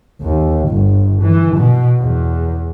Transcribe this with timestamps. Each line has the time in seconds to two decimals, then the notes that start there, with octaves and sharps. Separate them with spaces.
0.21 D#2
0.69 G1
1.22 E3
1.56 B2
2.00 E2